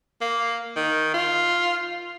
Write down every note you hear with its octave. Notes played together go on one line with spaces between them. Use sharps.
A#3
D#3
F4